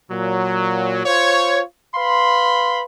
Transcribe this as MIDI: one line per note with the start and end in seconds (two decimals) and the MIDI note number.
0.11 1.05 46
0.11 1.05 54
1.06 1.60 65
1.06 1.60 72
1.06 1.60 73
1.95 2.82 71
1.95 2.82 77
1.95 2.82 83
1.95 2.82 84